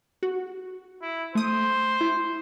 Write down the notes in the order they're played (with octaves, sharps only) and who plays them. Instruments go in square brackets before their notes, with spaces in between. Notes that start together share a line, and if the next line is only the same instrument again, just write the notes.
[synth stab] F#4
[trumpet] E4
[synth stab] A3 D#6 [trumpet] C5
[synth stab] E4